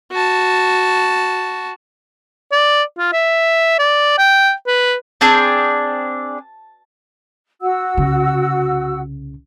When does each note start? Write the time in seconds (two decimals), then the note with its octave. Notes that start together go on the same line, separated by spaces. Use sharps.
0.12 F#4 A5
2.52 D5
2.98 F4
3.13 E5
3.79 D5
4.19 G5
4.67 B4
5.21 C4 D4 G#4 A5
7.61 F#4 F#5 E6
7.97 C2 C#3